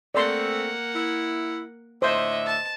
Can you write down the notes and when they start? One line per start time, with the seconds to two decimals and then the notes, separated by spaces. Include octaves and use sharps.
0.15 A3 A#3 C4 D5 F#5 C6
0.94 E4
2.02 A2 D3 C5 D#5 E5
2.46 A5